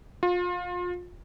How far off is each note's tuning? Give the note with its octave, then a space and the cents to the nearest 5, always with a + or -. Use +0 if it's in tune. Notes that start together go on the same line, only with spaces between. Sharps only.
F4 +30